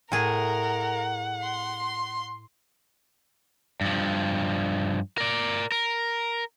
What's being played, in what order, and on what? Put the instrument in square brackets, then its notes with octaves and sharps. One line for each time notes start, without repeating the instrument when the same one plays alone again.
[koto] A2 G#4 [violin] A#4 [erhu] F#5
[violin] C6
[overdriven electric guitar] G2 F3
A#4 D5
A#4